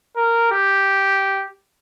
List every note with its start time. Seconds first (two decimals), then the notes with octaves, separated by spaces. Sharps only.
0.16 A#4
0.52 G4